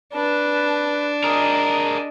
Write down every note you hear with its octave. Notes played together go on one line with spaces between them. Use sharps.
D4 B4 A5
G#4 A#4 D#5